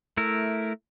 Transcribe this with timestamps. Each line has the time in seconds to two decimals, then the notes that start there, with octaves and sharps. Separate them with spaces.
0.17 A3 E4 A#4